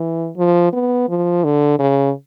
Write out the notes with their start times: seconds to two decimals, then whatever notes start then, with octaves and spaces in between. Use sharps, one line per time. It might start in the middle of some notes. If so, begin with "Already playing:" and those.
Already playing: E3
0.37 F3
0.73 B3
1.09 F3
1.44 D3
1.79 C#3